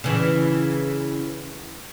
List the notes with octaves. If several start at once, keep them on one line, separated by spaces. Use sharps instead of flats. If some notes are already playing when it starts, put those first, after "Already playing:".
C#3 E3